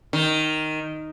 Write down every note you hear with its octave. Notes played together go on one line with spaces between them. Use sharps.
D#3